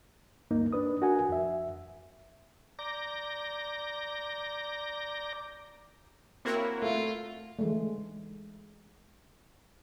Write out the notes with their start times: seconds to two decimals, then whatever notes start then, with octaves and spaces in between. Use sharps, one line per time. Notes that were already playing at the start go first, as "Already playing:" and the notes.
0.51 D2 G2 A#3 D#4
0.73 D4 B4 D#6
1.01 D4 F#4 A#4 F#5 G#5
1.29 F2 E5
2.79 D5 A#5 D6 G6 A#6
6.45 A#3 C4 E4 F#4 A#4 C#5
6.82 A3 F4
7.59 E3 G#3 A3